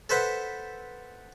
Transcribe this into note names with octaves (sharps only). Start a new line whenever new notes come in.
A4 B4 C5 E5 F#5